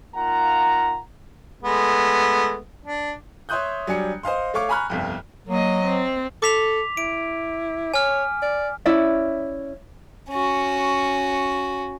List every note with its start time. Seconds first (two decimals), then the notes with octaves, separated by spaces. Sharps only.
0.15 A#3 D#4 F4 F#5 A#5
1.63 G#3 A3 B3
2.85 D4
3.49 C#5 E5 C6 D#6 F#6 G6
3.87 F#3 G3 D4 G#5 C#7
4.23 C5 D#5 F5 C6
4.54 A3 C#5 F5 C#6 D6
4.69 G#5 A#5 B5 C#6 F6 F#6
4.90 G1 C2 F2
5.48 F#3 A#3 D#5
5.84 C4
6.42 A4 D6 B6 F7
6.97 E4 D7
7.94 C#5 G#5 F6
8.42 D5
8.86 C#4 E4 D5 E5
10.29 C#4 F#4